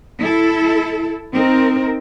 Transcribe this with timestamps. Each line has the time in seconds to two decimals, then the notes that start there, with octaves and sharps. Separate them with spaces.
0.20 E4 A4
1.34 C4 D#4 A#4